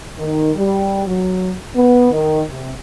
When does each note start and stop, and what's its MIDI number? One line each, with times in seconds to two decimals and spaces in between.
0.18 0.49 51
0.56 1.04 55
1.05 1.52 54
1.75 2.09 59
2.11 2.41 51
2.50 2.71 48